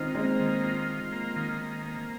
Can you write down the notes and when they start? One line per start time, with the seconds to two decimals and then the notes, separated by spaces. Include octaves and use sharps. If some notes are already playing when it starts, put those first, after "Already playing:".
Already playing: D#3 C4 D#4 F4
0.15 G#3 A#3 C4
0.39 D#3
0.64 F4
0.88 F4
1.12 A#3
1.36 D#3
1.61 A#3
1.86 A#3